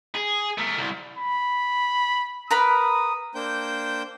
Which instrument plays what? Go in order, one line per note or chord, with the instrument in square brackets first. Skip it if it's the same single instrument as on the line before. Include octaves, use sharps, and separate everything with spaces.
[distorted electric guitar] G#4
A3 A#4
C2
[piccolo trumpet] B5
[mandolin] A#4 B4 B5 [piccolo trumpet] D#6
[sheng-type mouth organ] A#3 D4 C5 G5 G6